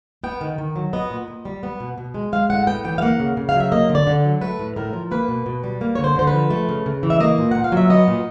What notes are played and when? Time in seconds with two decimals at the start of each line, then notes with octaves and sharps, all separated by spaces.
0.24 B3 G5
0.41 D#3
0.58 D#3
0.76 F#3
0.93 B3 D#5
1.10 A#2
1.28 A#2
1.45 G3
1.63 B3
1.80 B2
1.98 B2
2.14 G#3
2.32 G#3 F5
2.50 A2 F#5
2.67 B3 G5
2.84 E3 G5
2.98 F5
3.02 A#3 F#5
3.20 C#3
3.37 C#3
3.49 F5
3.54 F#3
3.60 E5
3.72 A#3 D#5
3.89 D3
3.95 D5
4.07 D3
4.24 F#3
4.41 A3 B4
4.59 A2
4.76 A2 A#4
4.93 F3
5.11 A#3 B4
5.28 B2
5.46 B2
5.64 G3
5.81 A#3
5.95 C#5
5.99 D3
6.04 C5
6.16 D3 C5
6.27 B4
6.33 F3
6.50 A3
6.69 C#3
6.86 C#3
7.03 E3
7.10 E5
7.20 A#3 D#5
7.38 A#2
7.51 A#2 F#5
7.64 F5
7.72 F#3 E5
7.90 B3 D#5
8.08 A#2